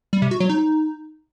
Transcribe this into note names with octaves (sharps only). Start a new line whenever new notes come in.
G3
C3
F#4
F#3
D#4